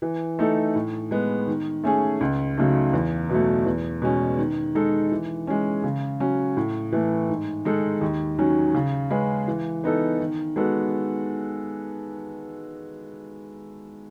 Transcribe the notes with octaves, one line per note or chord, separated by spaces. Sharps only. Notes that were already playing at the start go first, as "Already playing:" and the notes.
E3
A3 D#4 A4
A2
G#3 B3
D#3
A3 C#4 G#4
C#2
C#3 F#3 A3 D#4
E2
B2 F#3 A3
E2
B2 G#3 C#4
D#3
G#3 D#4 A4
E3
G#3 C#4
C#3
F#3 C#4
A2
E3 A3
G#2
D#3 G#3 D#4 A4
D#2
D#3 F#3 C#4
C#3
G#3 C#4 G#4 B4
E3
B3 D#4 A4
D#3
G#3 B3 F#4 A4